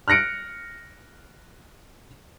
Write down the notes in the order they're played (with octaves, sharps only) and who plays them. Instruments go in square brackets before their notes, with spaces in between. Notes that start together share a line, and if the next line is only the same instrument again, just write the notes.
[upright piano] F6 F#6 A#6 C#7 D7